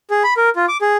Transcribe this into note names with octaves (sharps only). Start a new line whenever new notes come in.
G#4
B5
A#4
F4
D6
G#4